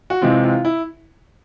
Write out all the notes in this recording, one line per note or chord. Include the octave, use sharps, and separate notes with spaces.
F#4
C3 E3 G#3 C4 F4
F4
E4